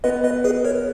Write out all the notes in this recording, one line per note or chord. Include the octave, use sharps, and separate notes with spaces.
B3 B4 D#5
B4 D#5
G#4 B4
A#4 C#5